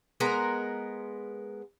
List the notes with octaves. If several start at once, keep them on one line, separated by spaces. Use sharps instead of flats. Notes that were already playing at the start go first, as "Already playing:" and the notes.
G#3 B3 A#4 A#5